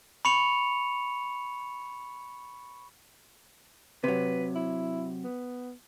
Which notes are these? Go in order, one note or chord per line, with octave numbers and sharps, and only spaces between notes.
B5 C#6 C#7 F7
C3 F#3 B4
E4
B3